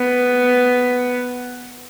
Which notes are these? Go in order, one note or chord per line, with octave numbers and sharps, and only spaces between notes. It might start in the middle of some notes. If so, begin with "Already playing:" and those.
Already playing: B3